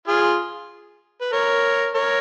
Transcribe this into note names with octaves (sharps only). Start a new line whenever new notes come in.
F4 G#4
B4
A#4 C#5
A#4 C#5